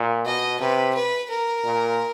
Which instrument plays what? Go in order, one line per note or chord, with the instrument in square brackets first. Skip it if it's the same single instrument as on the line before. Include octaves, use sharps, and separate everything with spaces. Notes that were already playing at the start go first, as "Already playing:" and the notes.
Already playing: [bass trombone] A#2
[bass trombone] B2 [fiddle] D#5
[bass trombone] C3 [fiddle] B4
[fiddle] B4
A#4
[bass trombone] A#2